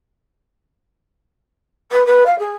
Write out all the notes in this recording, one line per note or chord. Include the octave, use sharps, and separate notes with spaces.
B4
B4
F5
G#4